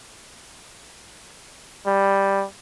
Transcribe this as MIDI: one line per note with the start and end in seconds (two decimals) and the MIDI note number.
1.86 2.45 55